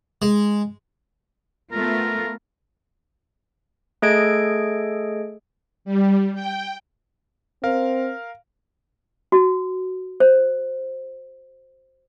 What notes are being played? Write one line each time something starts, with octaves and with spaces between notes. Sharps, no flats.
G#3
A3 B3 F4 A#4
A3 G#4 A4 D#5 G#6 D7
G3
G5
C4 A#4 F5
F#4
C5